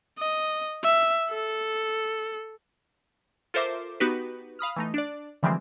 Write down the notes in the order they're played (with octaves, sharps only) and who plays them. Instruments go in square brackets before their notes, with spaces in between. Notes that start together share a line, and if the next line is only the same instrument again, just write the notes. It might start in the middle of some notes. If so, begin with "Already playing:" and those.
[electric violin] D#5
E5
A4
[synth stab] F4 A4 A#4 C5 E5 D6
B3 D#4 F#4 G4 B4
F5 B5 D#6 F6
E3 A3 D#4
D4 D5
D3 E3 F3 G3 G#3 C4